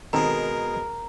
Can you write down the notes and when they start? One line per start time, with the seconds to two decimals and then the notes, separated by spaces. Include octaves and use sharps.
0.13 B2 D#3 G#3 C4 A4 A#4 A#5